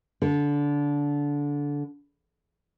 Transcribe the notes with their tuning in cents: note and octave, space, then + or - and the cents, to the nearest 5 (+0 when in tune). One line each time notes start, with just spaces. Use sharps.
D3 -20